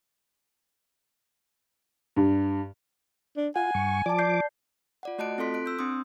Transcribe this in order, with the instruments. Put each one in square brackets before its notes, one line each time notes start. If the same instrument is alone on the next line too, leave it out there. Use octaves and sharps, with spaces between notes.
[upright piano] G2
[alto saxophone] D4
[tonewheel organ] F4 [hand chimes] F#5 [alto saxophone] G#5
[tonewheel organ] G2 C#6
[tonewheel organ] F3 D6 [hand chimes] D5 A5
[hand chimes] D5 G6 C7
F4 D5 F#5
A3 F#4 D#5 A5 F#6 D7
C4 F4 A4 C6 B6
F#6 D7
E6 G6
C4 D4 C6 D#6